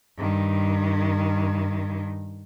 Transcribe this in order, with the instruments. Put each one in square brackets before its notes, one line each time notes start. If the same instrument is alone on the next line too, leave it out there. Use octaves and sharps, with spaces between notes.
[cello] G2 D#3